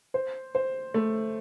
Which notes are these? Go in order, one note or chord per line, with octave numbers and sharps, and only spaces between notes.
C5
C5
A3